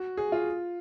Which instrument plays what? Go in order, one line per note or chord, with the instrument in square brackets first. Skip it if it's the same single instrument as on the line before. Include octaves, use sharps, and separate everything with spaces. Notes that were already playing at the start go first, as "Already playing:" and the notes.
Already playing: [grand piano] F#4
G#4
F4